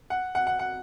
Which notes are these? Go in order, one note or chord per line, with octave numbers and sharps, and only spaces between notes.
F#5
F#5
F#5
F#5